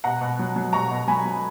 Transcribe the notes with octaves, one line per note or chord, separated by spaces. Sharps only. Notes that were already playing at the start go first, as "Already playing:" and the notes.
B2 F#5 A#5
B2
F#3
F#3
B2 A#5 C#6
B2
F#3 G#5 B5
F#3